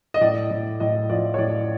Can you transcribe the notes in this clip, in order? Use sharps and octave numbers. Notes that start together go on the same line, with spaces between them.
D#5
A2 D5
A2
A2 D#5
F3 D5
C#5
A2 D5